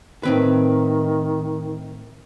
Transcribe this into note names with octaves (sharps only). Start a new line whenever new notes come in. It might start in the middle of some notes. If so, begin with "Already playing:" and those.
A2 D#3 C4 B4